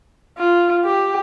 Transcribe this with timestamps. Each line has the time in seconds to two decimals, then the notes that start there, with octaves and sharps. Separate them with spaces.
0.38 F4
0.85 G4